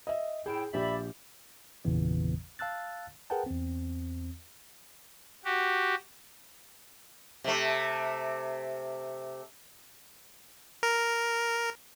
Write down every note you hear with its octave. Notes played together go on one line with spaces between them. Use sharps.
D#5 E5
A2 E4 G#4 G5
A#1 G4 D5 E5 B5
G#1 E2 A#2 C#3 E3 B3
F5 A5 E6 F#6 A6
G#4 A#4 B4 F#5 G5 A5
E2 C4
F#4 G4
C3 A3
A#4